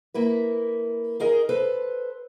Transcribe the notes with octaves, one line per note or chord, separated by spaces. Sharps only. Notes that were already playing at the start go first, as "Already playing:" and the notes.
A#3 E4 B4
D#4 G#4 A#4 D#5
A4 B4 C5